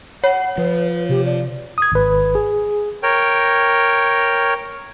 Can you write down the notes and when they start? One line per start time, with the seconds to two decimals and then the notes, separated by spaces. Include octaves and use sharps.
0.24 C#5 F#5
0.58 F3 B4
1.09 C3 G4
1.25 D5
1.78 D#6 G#6
1.92 G#1 B4
2.35 G#4
3.03 A#4 C#5 G5